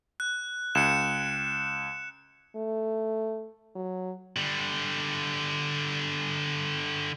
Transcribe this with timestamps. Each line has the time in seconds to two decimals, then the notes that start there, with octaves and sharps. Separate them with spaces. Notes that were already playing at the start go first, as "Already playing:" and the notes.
0.20 F#6
0.75 C#2 C#7 E7
2.56 A3
3.76 F#3
4.36 D3 G3